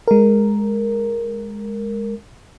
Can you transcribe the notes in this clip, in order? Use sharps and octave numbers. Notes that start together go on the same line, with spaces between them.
G#3 A#4